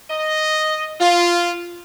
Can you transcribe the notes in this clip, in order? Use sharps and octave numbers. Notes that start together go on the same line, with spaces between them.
D#5
F4